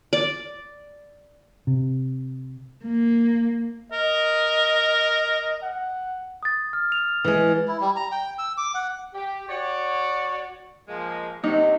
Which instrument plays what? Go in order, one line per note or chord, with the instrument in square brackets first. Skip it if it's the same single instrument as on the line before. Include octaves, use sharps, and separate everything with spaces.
[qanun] D5
[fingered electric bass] C3
[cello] A#3
[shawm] A#4 [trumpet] D#5
[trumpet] F#5
[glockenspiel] D#6 A6
F6
F7
[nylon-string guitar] E3 G#3
[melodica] E4
G3
A#5
G5
E6
D6
F#5
[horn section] G4
F#4 C#5 D5
F3 G#3 A#3
[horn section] C3 F#3 [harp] D#4